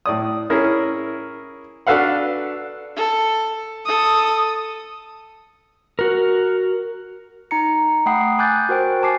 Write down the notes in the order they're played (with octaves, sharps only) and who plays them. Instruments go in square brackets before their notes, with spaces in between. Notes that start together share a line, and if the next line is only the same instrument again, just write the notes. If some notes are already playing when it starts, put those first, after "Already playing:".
[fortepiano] A2 D5 D#6
C#4 E4 G#4 A#4
D4 F#4 A4 B4 F5 F#5
[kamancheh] A4
A4 D#6
[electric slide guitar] F#4 A#4
[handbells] D#4 A#5 C#7
A3 F#5 G5 B5 D#6 C7
G#5 D6 F#6 G6 A6
F#4 A#4 C5 G5
G#5 A5 D6 C7